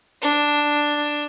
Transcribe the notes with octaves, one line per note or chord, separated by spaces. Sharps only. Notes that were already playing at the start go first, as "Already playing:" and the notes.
D4